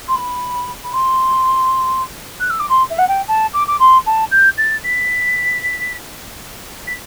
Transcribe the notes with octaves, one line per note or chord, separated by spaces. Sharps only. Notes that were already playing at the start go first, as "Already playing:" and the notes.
C6
B5
B5
C6
F#6
E6
D6
C6
E5
F#5
G5
A5
D6
D6
C6
A5
G6
A6
B6
B6